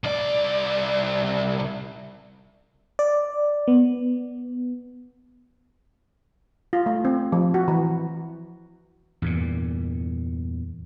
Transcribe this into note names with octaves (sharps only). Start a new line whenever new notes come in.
C2 D5
D5
B3
F4
A3
C4
F3
F#4
E3
E2 G2 A#2